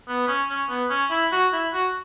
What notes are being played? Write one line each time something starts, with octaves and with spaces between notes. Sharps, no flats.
B3
C#4
C#4
B3
C#4
E4
F#4
E4
F#4